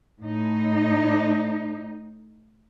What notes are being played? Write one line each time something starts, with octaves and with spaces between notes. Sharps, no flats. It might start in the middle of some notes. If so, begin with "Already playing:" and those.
A2 D#4